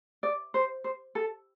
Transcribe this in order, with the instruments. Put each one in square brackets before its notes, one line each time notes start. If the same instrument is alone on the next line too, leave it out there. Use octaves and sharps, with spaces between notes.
[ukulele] D5
C5
C5
A4